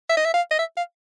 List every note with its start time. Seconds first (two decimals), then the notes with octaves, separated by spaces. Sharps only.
0.09 E5
0.17 D#5
0.25 E5
0.34 F5
0.51 D#5
0.59 E5
0.77 F5